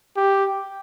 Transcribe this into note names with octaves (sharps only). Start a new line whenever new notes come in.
G4